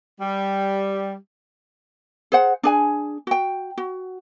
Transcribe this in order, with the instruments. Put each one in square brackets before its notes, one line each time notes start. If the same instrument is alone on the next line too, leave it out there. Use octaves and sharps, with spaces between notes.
[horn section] G3
[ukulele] G#4 C5 F#5
D4 G#4 G#5
F#4 G5
F#4